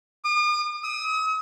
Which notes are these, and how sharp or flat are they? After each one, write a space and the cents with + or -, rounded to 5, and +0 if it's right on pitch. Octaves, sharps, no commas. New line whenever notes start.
D#6 -45
D#6 +45